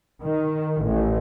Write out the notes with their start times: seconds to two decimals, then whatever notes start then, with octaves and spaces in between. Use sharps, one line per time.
0.23 D#3
0.84 A1